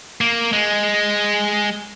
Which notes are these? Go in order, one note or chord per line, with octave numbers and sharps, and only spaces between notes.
A#3
G#3